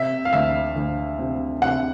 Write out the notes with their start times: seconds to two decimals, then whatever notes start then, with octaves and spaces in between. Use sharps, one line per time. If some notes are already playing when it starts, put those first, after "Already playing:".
Already playing: C3 E5
0.25 F5
0.33 D2 E5
0.76 D2
1.19 C3
1.62 C3 F#5